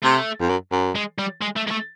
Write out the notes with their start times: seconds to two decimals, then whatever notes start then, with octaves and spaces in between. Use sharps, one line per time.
0.03 C3 A3
0.40 F2
0.49 F#2
0.72 F#2
0.95 G#3
1.18 G3
1.41 G#3
1.56 A3
1.67 G#3
1.71 A3